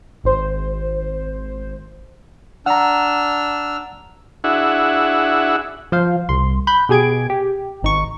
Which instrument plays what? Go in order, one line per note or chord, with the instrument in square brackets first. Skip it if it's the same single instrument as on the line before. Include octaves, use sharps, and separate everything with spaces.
[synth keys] G#1 C5
[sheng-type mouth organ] D4 E6 F6 [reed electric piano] F#5 A#5
[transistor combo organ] D4 E4 F#4 G#4 E5 F#5
[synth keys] F3 C5 F5
C2 C6
B5 F#6 G6
B2 G4 G#4 G#6 D7
G4
G#1 D#4 C#6